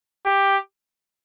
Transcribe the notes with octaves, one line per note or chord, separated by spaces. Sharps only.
G4